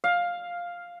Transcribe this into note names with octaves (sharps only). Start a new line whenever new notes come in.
F5